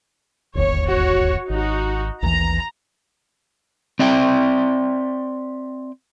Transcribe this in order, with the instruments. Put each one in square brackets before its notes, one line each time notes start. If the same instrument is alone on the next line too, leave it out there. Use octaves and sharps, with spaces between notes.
[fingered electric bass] D1 G1 D#2 [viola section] C#5
[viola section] F#4 C#5
[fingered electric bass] G#1 [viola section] D#4 F#4
[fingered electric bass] A1 D#2 E3 [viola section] A#5
[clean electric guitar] C4 D5 E5 G5